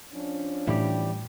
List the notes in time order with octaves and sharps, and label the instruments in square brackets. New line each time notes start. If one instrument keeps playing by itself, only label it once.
[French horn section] F3 C#4 D4
[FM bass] A2 [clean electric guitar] E3 G3 G4